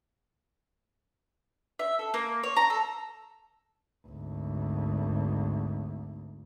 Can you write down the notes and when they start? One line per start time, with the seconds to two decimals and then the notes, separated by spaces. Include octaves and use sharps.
1.79 E5
1.99 A4
2.14 A#3
2.43 C#5
2.56 A#5
2.70 A4
4.07 G#1 D2